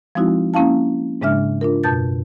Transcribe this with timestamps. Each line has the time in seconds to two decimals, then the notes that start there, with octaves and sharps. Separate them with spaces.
0.15 F3 G#3 C4 D#4 E4 F#4
0.54 A#3 C#4 E4 F5 A5
1.21 G#2 C#3 G#3 D4 E5 F6
1.61 D4 F4 A#4
1.84 F#2 B2 A5 G6 A6